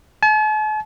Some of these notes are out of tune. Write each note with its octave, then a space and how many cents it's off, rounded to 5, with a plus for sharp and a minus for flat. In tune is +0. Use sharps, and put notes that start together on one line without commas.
A5 -45